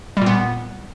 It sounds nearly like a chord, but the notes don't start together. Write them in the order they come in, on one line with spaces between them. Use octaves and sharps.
G3 A#2 B3